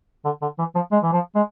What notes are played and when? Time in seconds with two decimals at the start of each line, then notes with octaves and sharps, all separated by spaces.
0.25 D3
0.42 D3
0.59 E3
0.75 F3
0.92 G#3
1.03 E3
1.12 F3
1.35 G#3